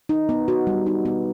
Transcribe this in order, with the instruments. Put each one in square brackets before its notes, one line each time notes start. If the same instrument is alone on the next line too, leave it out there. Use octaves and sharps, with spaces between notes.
[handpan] D#4
B3
F#4
G3
D#4
B3